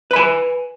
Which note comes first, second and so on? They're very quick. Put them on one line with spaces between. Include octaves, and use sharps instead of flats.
B4 B5 G#5